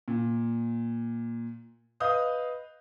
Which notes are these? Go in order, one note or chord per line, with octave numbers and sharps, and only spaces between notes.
A#2
B4 D#5 F5 D#6 G6